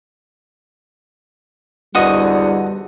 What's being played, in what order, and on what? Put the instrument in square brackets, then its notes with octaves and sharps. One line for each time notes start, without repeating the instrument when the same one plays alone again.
[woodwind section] E2 G#2 D3 [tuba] G3 [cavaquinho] F#4 D#5 D#6